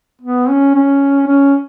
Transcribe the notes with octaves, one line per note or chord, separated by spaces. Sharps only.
B3
C#4
C#4
C#4